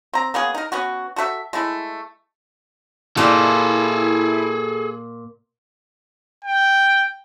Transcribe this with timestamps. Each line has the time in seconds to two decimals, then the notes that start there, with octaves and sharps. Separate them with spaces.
0.14 C4 A#5
0.34 A#3 B3 C#4 G#4
0.55 D#4 A#4
0.72 B3 C#4 F#4
1.16 F#4 A4 B4 E5
1.53 G#3 A3 E4
3.17 A#2 E4 G#4 A4 D#5 G5
6.45 G5